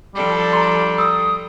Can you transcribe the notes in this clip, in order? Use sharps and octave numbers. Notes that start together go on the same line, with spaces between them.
F3 G3 D4 A4
A#5 C6
D#6 E6